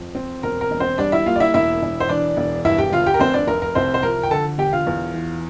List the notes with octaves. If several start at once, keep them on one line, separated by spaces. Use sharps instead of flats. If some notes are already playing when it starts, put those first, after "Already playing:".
Already playing: F2
C4
E1 A#4
A#4
E1
C4 C5
G3 D4 D5
E4 E5
A#3 F4 F5
D5
E4 E5
E1 E4 E5
E1
C5
E3 D4 D5
E1
G2 E4 E5
G4 G5
G1 F4 F5
G4 G5
A#4
F1 C4 C5
D4 D5
F1 A#4
A#4
C2 C4 C5
C5
F3 A#4
G5
D3 A4 A5
E1 G4 G5
F4 F5
E2
E3